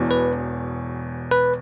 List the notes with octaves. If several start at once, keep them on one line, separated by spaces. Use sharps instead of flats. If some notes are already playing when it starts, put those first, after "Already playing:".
Already playing: E1 E2 B2
B4
B4